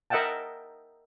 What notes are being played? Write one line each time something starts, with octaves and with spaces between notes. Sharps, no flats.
A#4 D#5 E5 F#5 G5 A5